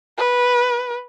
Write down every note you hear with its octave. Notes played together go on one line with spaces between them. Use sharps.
B4